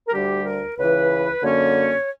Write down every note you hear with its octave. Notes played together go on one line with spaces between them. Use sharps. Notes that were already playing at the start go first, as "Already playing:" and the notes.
A#4
D2 D3 G3 G4
A#4
C#2 C#3 E3 B4
F#2 D3 A#3 C#4 C#5